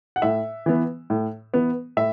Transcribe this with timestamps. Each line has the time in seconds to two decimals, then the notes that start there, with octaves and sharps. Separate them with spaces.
0.16 F#5
0.22 A2 E5
0.66 E3 B3
1.10 A2
1.54 E3 B3
1.97 A2 E5